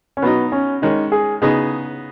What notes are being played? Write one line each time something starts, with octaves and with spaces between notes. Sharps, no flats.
C#4
B2 F#3 B3 D#4
C#4
D#3 G#3 C#4 D#4
G#4
C#3 B3 D#4 G#4